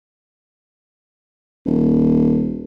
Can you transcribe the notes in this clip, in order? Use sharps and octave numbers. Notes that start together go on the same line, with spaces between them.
D#1